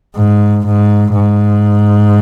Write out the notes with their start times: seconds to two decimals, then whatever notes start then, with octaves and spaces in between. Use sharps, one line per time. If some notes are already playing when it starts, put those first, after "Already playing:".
0.16 G#2
0.66 G#2
1.15 G#2